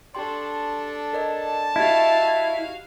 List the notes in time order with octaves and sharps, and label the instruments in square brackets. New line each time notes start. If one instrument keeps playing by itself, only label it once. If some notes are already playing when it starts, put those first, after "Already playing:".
[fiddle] D4 A4 [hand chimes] G4 G5 C6
[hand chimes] A#4 D5 D#5 [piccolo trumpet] A5
[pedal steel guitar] E4 [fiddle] F#4 F5 [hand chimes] G4 D#5